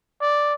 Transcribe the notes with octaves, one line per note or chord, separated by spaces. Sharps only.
D5